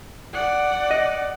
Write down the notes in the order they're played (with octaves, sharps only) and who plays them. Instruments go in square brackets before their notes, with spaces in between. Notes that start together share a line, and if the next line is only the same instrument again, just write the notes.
[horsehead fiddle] D5 F#5
[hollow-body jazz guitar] D#5